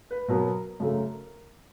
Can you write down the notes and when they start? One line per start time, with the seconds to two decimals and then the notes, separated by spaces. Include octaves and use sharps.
0.11 B4
0.28 B2 F#3 B3 A#4
0.80 F#2 C#3 F#3 A3